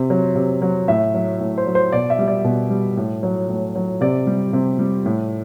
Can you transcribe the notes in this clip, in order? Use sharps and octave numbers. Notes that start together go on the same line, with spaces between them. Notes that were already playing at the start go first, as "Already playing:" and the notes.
Already playing: C3
F#3
C3
F#3
A2 E5
F#3
A2
C5
F#3
C5
B2 D5
E5
G3
D5
B2
G3
A2
F#3
A2
F#3
C3 D5
G3
C3
G3
A2